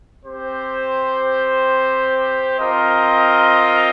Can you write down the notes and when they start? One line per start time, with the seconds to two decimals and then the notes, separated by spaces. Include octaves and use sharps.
0.22 C4 G4 C5
2.58 C4 F4 A#4 D#5